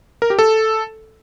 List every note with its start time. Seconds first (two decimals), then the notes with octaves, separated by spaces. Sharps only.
0.22 A#4
0.30 G4
0.39 A4